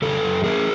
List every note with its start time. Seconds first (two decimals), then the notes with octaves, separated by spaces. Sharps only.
0.02 C#3 G4 A4
0.24 F#2
0.44 A#3 G#4 A#4